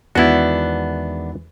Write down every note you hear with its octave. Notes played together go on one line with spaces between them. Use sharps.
E2 D#3 G#3 B3 D4 E4 F#4